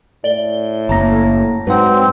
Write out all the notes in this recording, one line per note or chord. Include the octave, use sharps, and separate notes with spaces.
A2 D5 G7
F#1 A#3 A5 A#5 A#6
G#2 F#3 C4 B4 F#5